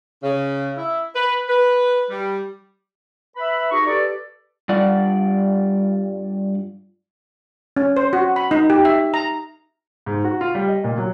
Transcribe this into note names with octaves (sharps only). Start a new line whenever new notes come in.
C#3
E4
B4
B4
G3
B4 E5 B5
D#4 F#4 G#4 A#5 C#6
G4 A4 B4 D5
G2 G3 F4 D5 F#5
C#4
C5
F#4
B5
D#4
G4
E5
A#5
G#2
F#4
F4
G3
D#5
A#2
F#3